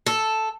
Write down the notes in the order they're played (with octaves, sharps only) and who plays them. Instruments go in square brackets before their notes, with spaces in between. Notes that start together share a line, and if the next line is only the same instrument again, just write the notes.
[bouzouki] A4